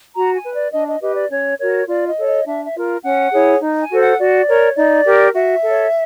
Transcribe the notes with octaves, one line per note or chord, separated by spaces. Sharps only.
F#4 A#5
G#5
B4
D5
D4 D#5
D#5
G4 B4 D#5
D5
C#4 C#5
F#4 A#4 C#5
F4 D5
D#5
A4 C#5
D#5
D4 E5
E5
F4 A#4
C#4 F#5
E4 G#4 C#5
D#4
G#5
F#4 A4 C5
F#5
F#4 D5
A#4 C#5
D#4 D5
G4 A#4
F#4 E5
A4 C#5